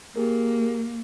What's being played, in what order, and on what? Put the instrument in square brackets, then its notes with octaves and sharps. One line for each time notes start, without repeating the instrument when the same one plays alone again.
[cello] A#3 [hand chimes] G4 G#4 A#4